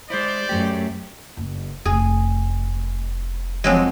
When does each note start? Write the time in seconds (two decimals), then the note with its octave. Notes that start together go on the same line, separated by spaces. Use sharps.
0.10 G#3 E4 C5 D5
0.49 F#2 F#3 A3 G4
1.37 F#1
1.85 F1 G#4
3.64 F2 F#3 G#3